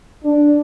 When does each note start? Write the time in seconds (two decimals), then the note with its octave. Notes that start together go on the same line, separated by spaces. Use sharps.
0.25 D4